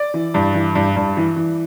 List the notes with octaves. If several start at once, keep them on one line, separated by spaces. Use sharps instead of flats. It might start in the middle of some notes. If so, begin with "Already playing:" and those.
Already playing: D5
E3
G2
E3
G2
G2
E3
E3